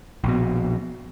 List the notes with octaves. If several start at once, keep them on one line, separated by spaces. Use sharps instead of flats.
A#1 B2